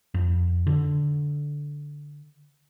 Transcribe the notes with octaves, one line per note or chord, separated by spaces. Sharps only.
F2
D3